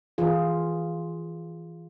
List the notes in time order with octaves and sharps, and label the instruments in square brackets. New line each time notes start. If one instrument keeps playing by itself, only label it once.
[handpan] E3 F4 G#4